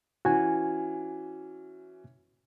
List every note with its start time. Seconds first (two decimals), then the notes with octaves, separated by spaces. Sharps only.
0.25 E3 C#4 F#4 G#5